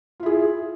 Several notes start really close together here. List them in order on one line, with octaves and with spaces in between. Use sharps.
F4 E4 G#4